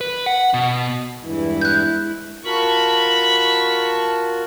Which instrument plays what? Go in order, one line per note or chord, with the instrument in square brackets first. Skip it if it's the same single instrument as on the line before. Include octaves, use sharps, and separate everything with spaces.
[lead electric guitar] B4
F#5
B2
[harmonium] E2 G2 E3 [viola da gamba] G#3 E4
[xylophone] F#6 G6
[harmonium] F4 F#4 A#4 [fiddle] A5 C#6 [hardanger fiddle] B5